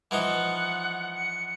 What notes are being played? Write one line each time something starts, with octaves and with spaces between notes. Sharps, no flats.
E3 F3 D#4 F#5
C#7